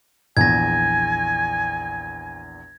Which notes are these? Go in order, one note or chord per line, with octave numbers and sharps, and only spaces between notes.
A#1 E2 G#5 G#6 A#6